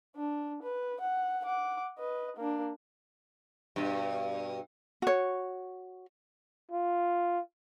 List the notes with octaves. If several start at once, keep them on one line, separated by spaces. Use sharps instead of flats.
D4
B4
F#5
F#5 D6
B4 D#5
A#3 D4
G2 B2
F#4 C#5
F4